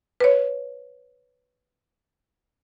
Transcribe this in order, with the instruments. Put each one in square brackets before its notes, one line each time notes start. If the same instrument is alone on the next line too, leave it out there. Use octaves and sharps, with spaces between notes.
[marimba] B4 C#5